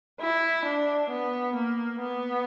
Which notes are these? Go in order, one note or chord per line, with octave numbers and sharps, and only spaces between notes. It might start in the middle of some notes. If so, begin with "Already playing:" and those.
E4
D4
B3
A#3
B3